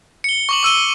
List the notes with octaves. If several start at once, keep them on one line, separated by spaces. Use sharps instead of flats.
C#7 G7
C#6 D6 F#7
D6 E6 D#7 G7